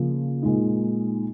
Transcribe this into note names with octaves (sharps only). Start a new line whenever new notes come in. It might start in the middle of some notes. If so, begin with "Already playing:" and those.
Already playing: C#3 F3 A#3
A#2 G#3 D#4